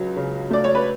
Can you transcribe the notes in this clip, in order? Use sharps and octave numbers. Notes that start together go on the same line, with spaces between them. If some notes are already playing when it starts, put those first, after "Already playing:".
Already playing: C#2 F#3
C#3
A3 D5
C#5
B4